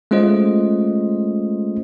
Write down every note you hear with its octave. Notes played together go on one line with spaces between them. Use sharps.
G#3 A3 C#4 F4 C5 D#5